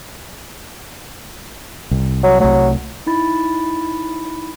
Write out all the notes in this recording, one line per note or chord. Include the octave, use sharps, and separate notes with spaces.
C2
F#3
C2 F#3 A3
D#4 E4 B5 A6